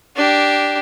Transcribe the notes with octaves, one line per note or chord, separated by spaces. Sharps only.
D4 G4